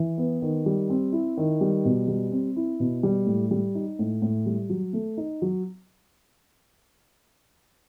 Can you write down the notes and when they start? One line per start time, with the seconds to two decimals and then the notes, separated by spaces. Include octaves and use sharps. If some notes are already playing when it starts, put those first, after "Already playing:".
Already playing: E3
0.18 B3
0.42 D#3
0.66 G3
0.90 C4
1.12 E4
1.37 D#3
1.61 G3
1.85 B2
2.08 G3
2.31 C4
2.56 E4
2.80 B2
3.03 G3
3.26 A2
3.51 G3
3.75 D#4
3.99 A2
4.22 A2
4.46 G3
4.69 F#3
4.93 A3
5.17 D#4
5.42 F#3